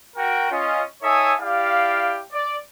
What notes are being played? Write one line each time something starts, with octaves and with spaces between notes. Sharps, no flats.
F#4 A#4 G5
C#4 F4 D#5
D#4 A4 C#5 E5 G#5 D#6
E4 G4 D5 F5
D5